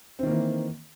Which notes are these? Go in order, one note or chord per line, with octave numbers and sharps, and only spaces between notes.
D#3 E3 A#3 C4